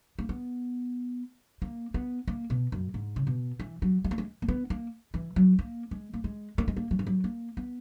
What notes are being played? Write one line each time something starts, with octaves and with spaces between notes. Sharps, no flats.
A#3
B3
A#3
B3
A#3
B2
F#2
G#2
C#3
B2
E3
F#3
G#3
A#3
G#3
A#3
B3
A#3
E3
F#3
A#3
G#3
A#3
G#3
A#3
G#3
A#3
F#3
E3
F#3
A#3
B3